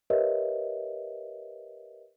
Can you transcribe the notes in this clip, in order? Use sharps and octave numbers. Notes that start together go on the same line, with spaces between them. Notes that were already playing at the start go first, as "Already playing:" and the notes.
G4 A#4 B4 C#5 D#5 E5